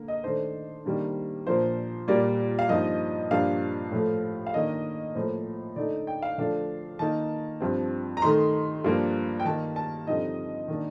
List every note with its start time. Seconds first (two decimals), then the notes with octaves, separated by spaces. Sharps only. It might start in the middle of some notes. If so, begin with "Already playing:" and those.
Already playing: D3 A#3
0.08 D#5
0.24 D#3 A3 D4 C5
0.85 D#3 G3 A#3 D4
1.47 A#2 F3 A#3 D4 C5
2.08 A#2 G3 A#3 D5
2.59 F5
2.69 G2 F3 A#3 D#4 D#5
3.31 G2 F3 A#3 D4 F5
3.92 A2 F3 A3
4.47 F5
4.54 D#3 A#3 D4 D#5
5.15 A2 F3 A#3 C5
5.76 D3 A3 D#4 D5
6.07 G5
6.22 F5
6.38 D3 F3 A3 D4 F5
6.99 D#3 A#3 D#4 A5
7.61 G2 F3 C4
8.17 A#5
8.22 D#3 A3 D#4 C6
8.84 G2 F3 A#3 D4
9.40 G5
9.45 D#3 A#3 D#4 A5
9.76 A5
10.07 G2 D3 F3 C4 D#4 D#5
10.68 D#3 A#3 D4